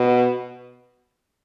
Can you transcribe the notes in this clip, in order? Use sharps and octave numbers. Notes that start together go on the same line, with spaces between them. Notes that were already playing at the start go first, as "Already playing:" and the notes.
Already playing: B2